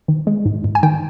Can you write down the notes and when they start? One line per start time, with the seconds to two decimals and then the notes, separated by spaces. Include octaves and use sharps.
0.08 D#3
0.27 G#3
0.46 G#2
0.64 G#2
0.75 G#5
0.83 D#3 G5